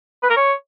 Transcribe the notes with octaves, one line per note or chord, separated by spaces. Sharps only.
B4
A#4
C#5